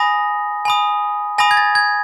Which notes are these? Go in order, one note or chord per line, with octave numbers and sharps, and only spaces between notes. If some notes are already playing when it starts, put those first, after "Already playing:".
Already playing: G#5 B5 D#6 A#6
G#5 B5 D#6
G#5 B5 D#6 A#6
G#6
A6
G#6